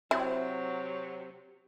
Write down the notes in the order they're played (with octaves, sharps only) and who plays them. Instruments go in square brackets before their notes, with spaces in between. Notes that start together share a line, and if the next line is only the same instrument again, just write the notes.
[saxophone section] C3 F#3 [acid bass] C4 [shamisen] E4